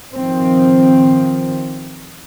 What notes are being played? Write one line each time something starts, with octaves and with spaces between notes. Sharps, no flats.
D#3 F3 C4